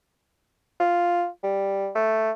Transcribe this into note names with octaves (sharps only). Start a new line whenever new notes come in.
F4
G3
A3